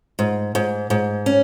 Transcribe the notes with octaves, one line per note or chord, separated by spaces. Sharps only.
G#2
G#2
G#2
C#4